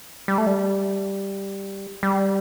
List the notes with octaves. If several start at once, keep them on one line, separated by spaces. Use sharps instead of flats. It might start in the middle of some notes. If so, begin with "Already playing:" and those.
G3
A3
G3
G3